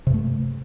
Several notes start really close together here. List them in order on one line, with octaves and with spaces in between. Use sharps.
C3 G2 A3